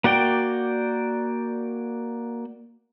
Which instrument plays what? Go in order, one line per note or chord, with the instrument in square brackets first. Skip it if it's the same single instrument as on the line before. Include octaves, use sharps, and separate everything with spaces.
[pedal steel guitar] A#3 F#4 D5 G5